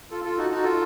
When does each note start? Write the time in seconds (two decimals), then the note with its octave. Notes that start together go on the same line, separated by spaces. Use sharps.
0.11 F4 A4
0.25 F4 A4
0.38 D#4 F#4
0.51 D#4 F#4
0.63 F4 A4